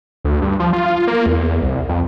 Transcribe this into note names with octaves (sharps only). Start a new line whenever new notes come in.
D2
G2
F3
F4
A#3
E2
C2
F2